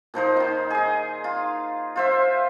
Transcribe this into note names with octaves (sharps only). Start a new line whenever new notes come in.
A#2 F3 D#4 C5
D#3 D#4
G#4 D#5
F4
F4 C5 E5